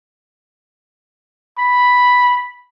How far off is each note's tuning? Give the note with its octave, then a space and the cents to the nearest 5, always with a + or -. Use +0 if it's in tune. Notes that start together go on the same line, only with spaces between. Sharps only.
B5 -5